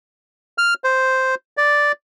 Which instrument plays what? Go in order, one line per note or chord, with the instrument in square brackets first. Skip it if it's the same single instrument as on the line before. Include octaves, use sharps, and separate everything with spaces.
[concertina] F6
C5
D5